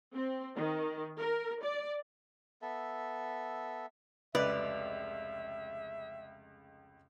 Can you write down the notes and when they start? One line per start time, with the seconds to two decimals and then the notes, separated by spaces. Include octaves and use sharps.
0.15 C4
0.56 D#3
1.18 A#4
1.63 D5
2.62 B3 A4 E5
4.35 F1 C#2 B4 D5 E5